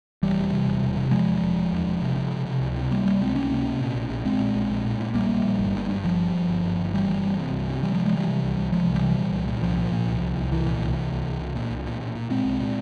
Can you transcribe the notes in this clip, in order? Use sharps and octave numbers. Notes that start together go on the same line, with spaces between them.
E1 E3 G3
E1
C3
E1
E1
C3
E1 F3 G#3
E1
E1
E1
E2
E1
C3
C3
C3
C3
C#2
C3
C#2 G3 A#3
C3 G3 A#3
C#2 G#3 C4
C#2 A#3 C#4
C3
C3
A#2
A#1
A#1
A#1 G#3 C4
A#2
A#1
A#1
A#2
A#2
A#1 G3 A#3
A#1
A#1
G1
G2
G2
G1 F3
G2
G1
G1
G1
G1
G2 E3 G3
G1
G1
C3
C2
C3
C3 E3 G3
F3 G#3
C3
F3 G#3
C3 E3 G3
C3
C2
C2
C3 F3 G#3
C2
E3 G3
C3
A#2
C2
A#2
C2 F3
A#2
A#2
C2
C2
C2
C2 E3
A#2
C2
C2
C2
C2
C2
A#2
C2
A#2
A#2
A#2
A#2 G#3 C4
C2
A#2